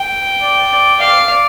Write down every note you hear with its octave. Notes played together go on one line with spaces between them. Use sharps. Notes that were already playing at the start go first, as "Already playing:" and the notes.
Already playing: G5
D5
D5
D5 F5
D5